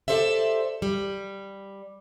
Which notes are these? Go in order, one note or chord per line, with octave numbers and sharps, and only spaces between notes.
G4 A4 C5 D5 E5
G3